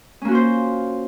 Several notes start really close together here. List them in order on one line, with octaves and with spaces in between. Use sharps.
C#4 A#3 F#4 F4 C5